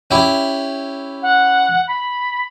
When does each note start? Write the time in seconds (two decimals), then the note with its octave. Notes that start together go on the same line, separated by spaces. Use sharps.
0.11 C#4 E4 G4
1.22 F#5
1.87 B5